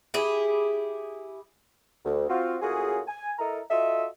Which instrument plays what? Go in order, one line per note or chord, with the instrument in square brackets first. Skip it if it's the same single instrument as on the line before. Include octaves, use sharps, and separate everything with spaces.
[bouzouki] E4 G4 G#4
[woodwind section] D2
C4 F4 F#4
A2 A#3 C#4 F4 F#4 G#4
G#5
E4 A4 A#4 D#5 A#5
F4 F#4 A4 D#5 E5